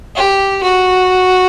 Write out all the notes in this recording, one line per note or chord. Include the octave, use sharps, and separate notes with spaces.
G4
F#4